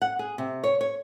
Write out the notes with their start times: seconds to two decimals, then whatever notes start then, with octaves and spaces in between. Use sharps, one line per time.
0.02 F#5
0.19 G#4
0.38 C3
0.64 C#5
0.81 C#5